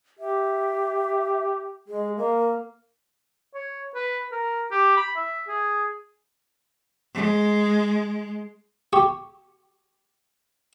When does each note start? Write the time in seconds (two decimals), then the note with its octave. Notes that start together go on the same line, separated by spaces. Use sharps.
0.19 G4 E5
1.88 G#3 G#4
2.18 A#3 A#4
3.54 C#5
3.95 B4
4.32 A#4
4.71 G4
4.97 B5
5.16 E5
5.48 G#4
7.14 G#3
8.93 G4 C#6